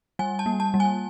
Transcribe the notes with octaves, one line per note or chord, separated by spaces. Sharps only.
G3 G#5
A5
A#3
A5
G3
G#5